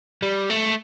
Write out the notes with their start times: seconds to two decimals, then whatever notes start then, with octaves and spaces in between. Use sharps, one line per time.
0.22 G3
0.50 A3